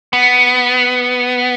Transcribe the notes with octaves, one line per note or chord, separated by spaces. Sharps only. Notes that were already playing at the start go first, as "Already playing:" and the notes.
B3